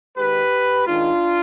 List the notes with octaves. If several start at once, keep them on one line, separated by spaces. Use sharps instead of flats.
G#2 D#3 G4 B4
G#2 D#3 D4 F4